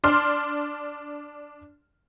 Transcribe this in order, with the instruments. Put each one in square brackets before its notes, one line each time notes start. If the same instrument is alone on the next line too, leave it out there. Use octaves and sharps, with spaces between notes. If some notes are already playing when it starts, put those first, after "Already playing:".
[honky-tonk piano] D4 C6 F6